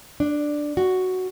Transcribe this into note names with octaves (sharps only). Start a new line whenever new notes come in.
D4
F#4